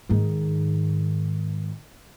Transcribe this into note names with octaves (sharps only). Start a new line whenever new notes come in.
G#2 D#3